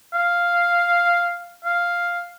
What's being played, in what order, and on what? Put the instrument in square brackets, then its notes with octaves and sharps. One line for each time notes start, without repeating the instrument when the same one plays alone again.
[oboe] F5
F5